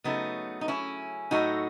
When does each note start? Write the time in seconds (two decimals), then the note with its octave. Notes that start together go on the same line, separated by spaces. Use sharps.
0.04 C#3 F#3 A3 B3 D#4
0.61 D#4
0.68 C#4 E4
1.31 A2 F#3 A3 D#4 F#4